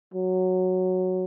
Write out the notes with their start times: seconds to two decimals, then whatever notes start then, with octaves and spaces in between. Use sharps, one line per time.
0.14 F#3